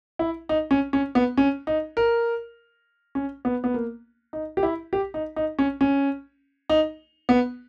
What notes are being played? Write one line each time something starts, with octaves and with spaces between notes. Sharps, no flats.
E4
D#4
C#4
C#4
B3
C#4
D#4
A#4
C#4
B3
B3
A#3
D#4
G4
E4
G4
D#4
D#4
C#4
C#4
D#4
B3